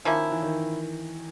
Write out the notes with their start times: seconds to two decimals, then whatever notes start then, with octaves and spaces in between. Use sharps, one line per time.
0.05 D#3 F3 A#3 C#4 E4
0.32 E3
0.42 D#3